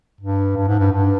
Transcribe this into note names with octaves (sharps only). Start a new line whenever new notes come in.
G2
G2
G#2
G2
G2